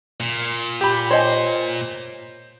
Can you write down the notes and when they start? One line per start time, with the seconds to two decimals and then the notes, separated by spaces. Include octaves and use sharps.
0.20 A#2
0.81 G4 B5
1.11 C5 C#5 D#5 G#5